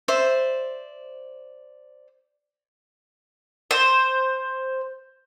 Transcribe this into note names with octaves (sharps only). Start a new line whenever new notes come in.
C5 D5 E5
C5